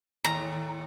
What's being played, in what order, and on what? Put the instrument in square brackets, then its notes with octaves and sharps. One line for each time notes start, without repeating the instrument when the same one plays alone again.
[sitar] D#2 A2 [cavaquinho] A#5